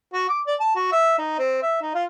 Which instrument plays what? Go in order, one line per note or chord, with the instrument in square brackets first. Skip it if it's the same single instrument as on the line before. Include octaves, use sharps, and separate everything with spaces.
[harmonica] F#4
D6
D5
A5
F#4
E5
D#4
C4
E5
D#4
F4